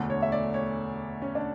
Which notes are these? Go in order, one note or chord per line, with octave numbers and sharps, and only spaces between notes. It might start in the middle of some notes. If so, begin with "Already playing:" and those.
Already playing: E1 D2 D3 A3
C#5
E5
D5
C#5
C#4
D4